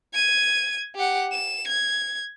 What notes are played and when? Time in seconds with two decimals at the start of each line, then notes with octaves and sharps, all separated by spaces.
0.14 G#6 D#7
0.95 G4 F#5
1.32 E7
1.67 G#6